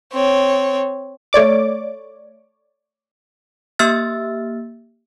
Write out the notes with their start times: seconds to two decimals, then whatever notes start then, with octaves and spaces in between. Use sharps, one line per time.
0.13 C4 C#5
1.33 A3 C#5 D5 D6
3.79 A#3 G4 E5 E6 F6 A6